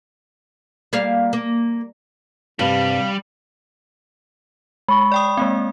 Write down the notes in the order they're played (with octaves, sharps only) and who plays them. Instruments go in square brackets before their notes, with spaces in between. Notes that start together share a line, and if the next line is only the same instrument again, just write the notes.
[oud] G3 A#3 F5
A#3
[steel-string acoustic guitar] G2 [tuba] C3 [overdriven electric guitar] G3 [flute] F5
[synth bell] G#3 [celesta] B5 C#6
[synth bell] D5 G5 D#6
G#3 A#3 C4